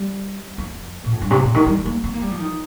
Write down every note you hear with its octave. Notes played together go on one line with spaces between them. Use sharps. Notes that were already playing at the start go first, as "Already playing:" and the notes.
Already playing: G3
F2
A#2
F2
G2
C3
A#2
D#3
G3
A#3
C4
A#3
G3
F3
D#3